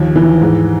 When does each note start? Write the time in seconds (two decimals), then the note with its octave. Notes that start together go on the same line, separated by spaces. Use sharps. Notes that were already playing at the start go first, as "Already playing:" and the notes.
Already playing: D#2 F3
0.16 E3
0.41 G#2